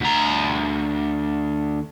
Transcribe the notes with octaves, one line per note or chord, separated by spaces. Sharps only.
D2 A#5